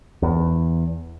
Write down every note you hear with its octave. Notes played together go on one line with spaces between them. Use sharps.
E2